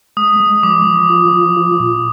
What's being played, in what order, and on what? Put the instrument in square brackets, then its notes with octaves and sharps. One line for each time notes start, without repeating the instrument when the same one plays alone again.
[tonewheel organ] G#3 [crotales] D#6
[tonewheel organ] G#3
[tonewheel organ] F3 [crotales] D6
[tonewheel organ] F3
F4
F3
F4
A#2